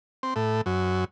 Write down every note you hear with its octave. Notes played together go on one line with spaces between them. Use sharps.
C4
A2
F#2